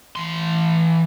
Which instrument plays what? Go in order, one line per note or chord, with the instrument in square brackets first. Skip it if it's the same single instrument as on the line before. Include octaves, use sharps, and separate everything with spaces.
[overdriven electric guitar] E3 C6